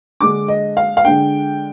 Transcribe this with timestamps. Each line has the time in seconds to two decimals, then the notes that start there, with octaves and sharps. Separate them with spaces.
0.20 D3 G#3 D4 D6
0.48 D#5
0.77 F5
0.97 F5
1.05 D3 G#3 D4 G5